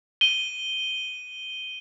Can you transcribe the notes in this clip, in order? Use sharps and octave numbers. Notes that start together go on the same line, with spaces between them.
D#7 G7